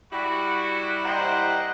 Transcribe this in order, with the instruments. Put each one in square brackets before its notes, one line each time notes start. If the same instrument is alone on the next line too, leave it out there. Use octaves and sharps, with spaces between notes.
[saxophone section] G3 E4 [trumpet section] F#4 [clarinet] B5
[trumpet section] C5 [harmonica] D#5 F#5 G5 [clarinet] A#5